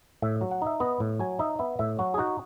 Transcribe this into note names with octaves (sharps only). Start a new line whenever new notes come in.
A2 E5
F#3
F#5
D#4 E5
B3 D#5
A2
F#3 G#5
D#4 E5
B3 E5
A2 E5
F#3 F#4
G#4
D#4 F#4